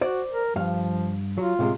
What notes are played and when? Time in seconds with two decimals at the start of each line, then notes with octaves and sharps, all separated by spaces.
0.01 F#4 C5 D5
0.30 A#4
0.56 G2 F3 F5
1.38 F#3 F4
1.59 A2 C3 G#3